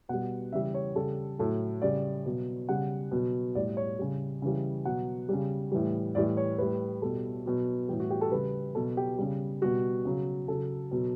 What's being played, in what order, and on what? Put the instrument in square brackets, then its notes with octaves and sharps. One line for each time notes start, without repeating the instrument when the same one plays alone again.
[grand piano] B2 G3 F#5
C#3 E3 G3 E5
C#5
C#3 G3 A4
A2 F#3 A4
C#3 G3 D5
B2 F#3
C#3 G3 F#5
B2 F#3
A2 G3 D5
C#5
C#3 G3
C#3 E3 G3
B2 F#3 F#5
C#3 G3
A2 E3 G3
A2 E3 G3 D5
C#5
A2 G3 B4
B2 G3 A4
B2 F#3
A2 E3 G3 G4
F#4
G4
A4
C#3 G3 B4
B2 F#3 A4
G4
C#3 G3
B2 G3 F#4
C#3 F#3
C#3 F#3 A4
B2 F#3